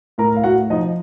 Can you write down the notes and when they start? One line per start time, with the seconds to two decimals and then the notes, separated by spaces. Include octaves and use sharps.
0.18 A2 A#4 A#5
0.36 F5
0.44 A2 F#4 F#5
0.70 F3 D#4 D#5